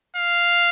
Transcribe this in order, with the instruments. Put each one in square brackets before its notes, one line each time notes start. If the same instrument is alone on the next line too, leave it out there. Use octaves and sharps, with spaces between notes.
[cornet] F5